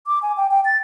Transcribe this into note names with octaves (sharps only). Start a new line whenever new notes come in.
D6
G#5
G5
G5
A6